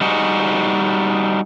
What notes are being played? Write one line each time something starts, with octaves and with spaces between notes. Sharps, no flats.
G3 D#4 F#4 G#4